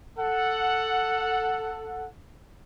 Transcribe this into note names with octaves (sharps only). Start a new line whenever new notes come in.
A4 F#5